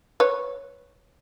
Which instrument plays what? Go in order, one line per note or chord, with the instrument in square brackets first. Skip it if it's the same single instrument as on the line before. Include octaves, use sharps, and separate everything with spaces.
[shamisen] B4 C#5